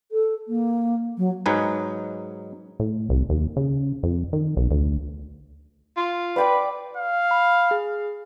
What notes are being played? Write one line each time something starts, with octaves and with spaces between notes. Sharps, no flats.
A4
A#3
F#3
G#2 F#3 D#4 B4 G#5
A2
C2
D#2
C#3
F2
D#3
B1
D2
F4
B4 D5 G5 D6
F5
B5
G#4